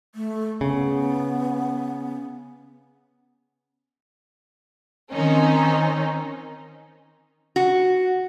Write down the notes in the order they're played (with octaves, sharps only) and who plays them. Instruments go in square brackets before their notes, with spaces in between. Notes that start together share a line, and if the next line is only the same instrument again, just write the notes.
[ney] A3
[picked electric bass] C#3 [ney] B3
[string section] D#3 C4 C#4 D#4
[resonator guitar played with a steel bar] F#4